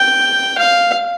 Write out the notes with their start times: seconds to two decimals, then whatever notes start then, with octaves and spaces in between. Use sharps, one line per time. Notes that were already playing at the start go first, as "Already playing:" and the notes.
Already playing: G5
0.58 F5